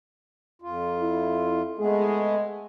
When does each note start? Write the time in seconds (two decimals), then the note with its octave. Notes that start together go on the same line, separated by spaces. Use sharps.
0.62 F2 F4
1.00 E4
1.79 G#3 A3 B3 G#4